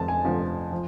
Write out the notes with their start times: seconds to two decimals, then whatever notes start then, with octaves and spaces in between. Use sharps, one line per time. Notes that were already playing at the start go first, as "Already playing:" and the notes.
Already playing: F1 F2 D3 F3 A5
0.08 G#5
0.24 F1 F2 D3 F3
0.72 F3